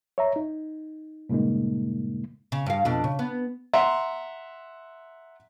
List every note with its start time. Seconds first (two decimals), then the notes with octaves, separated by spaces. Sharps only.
0.18 C#5 E5 A#5
0.36 D#4
1.29 G2 A#2 C#3 G#3 A#3 D#4
2.52 C#3
2.66 G2 F5
2.85 F2 B2 D4
3.04 C#3
3.19 B3
3.74 E5 F#5 A#5 C6